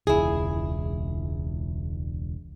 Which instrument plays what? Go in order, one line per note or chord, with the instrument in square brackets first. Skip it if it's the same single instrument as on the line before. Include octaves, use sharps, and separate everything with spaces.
[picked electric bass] E1 C#2 [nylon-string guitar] E4 G#4